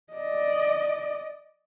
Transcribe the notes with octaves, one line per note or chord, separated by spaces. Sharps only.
D5 D#5